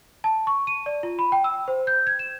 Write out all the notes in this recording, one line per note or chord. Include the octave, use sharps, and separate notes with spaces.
A5
C#6
D#7
D5
F4
B5
G5
E6
C5
G6
G#6
E7